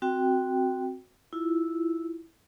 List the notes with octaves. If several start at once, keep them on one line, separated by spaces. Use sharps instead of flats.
C4 F#4 G5
E4 F4